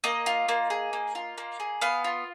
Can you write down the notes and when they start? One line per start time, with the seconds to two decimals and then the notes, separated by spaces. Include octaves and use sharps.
0.04 A#3 D#5
0.26 F4
0.49 A#3
0.70 G#4
0.93 A#3
1.15 F4
1.38 A#3
1.60 G#4
1.81 B3 F5
2.04 F4